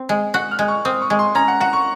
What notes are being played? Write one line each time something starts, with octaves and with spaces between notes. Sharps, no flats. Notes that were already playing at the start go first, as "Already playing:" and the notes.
Already playing: C4
G#3
F#4 F#6
F6
G#3
C#6
C4 D#6
C#6
G#3
C6
C#4 A#5
F#5
F#4 F#5
C#6